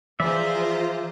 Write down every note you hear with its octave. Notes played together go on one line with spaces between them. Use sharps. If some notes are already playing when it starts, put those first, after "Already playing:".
E3 F3 F4 G#4 C5 D5 E5 A#5